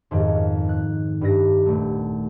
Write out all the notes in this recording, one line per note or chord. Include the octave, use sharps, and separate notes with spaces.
F2 G#2 D#3
F#6
G2 B4 A#6
D#1 A3